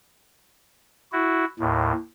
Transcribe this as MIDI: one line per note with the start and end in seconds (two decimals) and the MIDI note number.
1.12 1.45 64
1.12 1.45 66
1.59 1.92 39
1.59 1.92 45